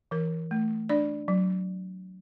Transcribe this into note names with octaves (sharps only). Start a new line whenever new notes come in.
E3 A#4
A3
D4 D5
F#3